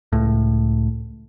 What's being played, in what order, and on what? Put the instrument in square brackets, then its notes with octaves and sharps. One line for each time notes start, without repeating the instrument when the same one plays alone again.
[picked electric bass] C#2 A2